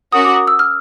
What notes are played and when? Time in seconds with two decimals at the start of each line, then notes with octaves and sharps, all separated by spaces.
0.12 C#4 F#4 A#4 D#6
0.25 D6
0.36 D#6
0.47 E6
0.59 F6